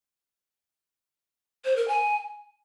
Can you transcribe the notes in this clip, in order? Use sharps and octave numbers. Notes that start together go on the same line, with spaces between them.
C5
A#4
G#5